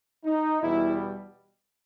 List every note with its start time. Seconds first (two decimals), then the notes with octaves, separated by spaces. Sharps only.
0.24 D#4
0.61 E2 B2 G3 E4